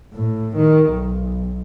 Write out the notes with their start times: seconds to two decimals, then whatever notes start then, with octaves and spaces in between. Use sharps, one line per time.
0.14 A2
0.56 D#3
0.90 B1